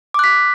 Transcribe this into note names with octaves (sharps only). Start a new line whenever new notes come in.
D6 F#6 B6